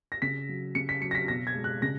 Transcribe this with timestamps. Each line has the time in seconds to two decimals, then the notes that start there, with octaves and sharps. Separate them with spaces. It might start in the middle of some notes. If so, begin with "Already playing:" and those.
0.12 A#6
0.22 C#3 B6
0.49 F#3
0.75 C#3 C#7
0.89 B6
1.02 F#3 C#7
1.11 A#6
1.15 B6
1.28 B2 A#6
1.47 G#6
1.55 G#3
1.64 F#6
1.82 C#3 A#6